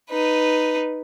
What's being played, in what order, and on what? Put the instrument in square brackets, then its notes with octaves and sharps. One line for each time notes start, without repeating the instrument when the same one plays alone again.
[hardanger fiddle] D#4 B4